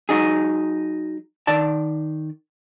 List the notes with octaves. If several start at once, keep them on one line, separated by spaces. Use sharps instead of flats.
F#3 D#4 G#4
D#3 D5 A5